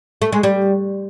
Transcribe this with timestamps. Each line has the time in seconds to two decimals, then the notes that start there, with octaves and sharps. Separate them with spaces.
0.22 A3
0.32 G#3
0.43 G3